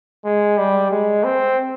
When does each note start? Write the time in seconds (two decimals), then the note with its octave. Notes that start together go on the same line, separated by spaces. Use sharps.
0.25 G#3
0.58 G3
0.91 G#3
1.24 C4